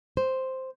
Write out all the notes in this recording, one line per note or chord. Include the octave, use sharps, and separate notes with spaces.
C5